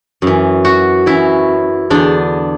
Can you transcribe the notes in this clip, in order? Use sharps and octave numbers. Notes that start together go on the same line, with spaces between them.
F#2 E3
F#4
F#2 E3 E4
E2 D3 D4